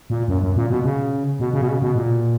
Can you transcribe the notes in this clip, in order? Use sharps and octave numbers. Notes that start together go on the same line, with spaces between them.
A#2
F#2
F#2
A#2
B2
C#3
B2
C#3
B2
C#3
B2
A#2